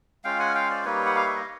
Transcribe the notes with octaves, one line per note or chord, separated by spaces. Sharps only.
G#3 C#4 F4 F5 G5
F#5 G#5
F5 G5
C5 D5
G3 A#3 D#4 B4 C#5
F#5
F5
E5
D#5